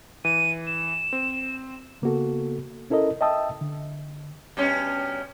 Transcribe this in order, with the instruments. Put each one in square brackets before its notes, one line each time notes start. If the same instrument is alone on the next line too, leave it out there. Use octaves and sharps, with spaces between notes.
[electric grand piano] E3 [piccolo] D#7
[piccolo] E7
[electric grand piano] C4
[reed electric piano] C#3 A#3 B3 F#4 A4
C#4 E4 A4 A#4 D#5
D#5 E5 G5 A5 D#6 E6
D3
[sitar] G2 B2 C#4